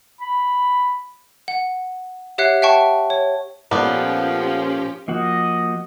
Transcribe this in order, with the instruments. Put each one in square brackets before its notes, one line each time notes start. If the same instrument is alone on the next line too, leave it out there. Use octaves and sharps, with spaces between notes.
[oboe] B5
[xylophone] F#5
G4 C#5 E5 F#5 F#6 C7
E5 F#5 G5 A5 C#6
C#5
[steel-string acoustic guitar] A#2 A#3 A4 [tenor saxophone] F3 [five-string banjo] B3 D5 [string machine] C#4 G4
[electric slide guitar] F3 A#3 F#4 [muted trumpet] D#5